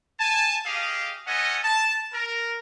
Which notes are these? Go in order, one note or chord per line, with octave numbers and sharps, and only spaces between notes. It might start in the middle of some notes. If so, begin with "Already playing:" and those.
G#5 A5
G4 G#4 D#5 F5
B3 C#4 A4 D#5 F#5 G#5
A5
A#4